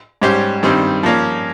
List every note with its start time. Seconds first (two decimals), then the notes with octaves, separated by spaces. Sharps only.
0.22 G#2 G3 C#4 G4 C5
0.63 G2 D#3 G3 C4
1.03 F3 A#3 C#4